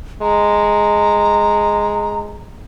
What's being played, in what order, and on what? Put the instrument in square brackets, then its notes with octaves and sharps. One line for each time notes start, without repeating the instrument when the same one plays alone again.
[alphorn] G#3 [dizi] A#5